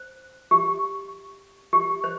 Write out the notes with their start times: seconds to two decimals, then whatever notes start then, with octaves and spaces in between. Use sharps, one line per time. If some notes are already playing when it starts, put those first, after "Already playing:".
Already playing: C5
0.51 G4
1.73 G4
2.04 C5